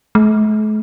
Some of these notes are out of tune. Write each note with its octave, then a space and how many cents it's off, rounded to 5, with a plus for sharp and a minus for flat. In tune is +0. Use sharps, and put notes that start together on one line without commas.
A3 -45